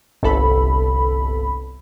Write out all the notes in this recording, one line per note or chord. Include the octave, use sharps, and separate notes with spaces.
G1 C2 A4 B5